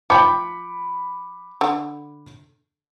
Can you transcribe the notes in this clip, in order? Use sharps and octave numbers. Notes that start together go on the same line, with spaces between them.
F3 G5 B5 D6 C#7
D3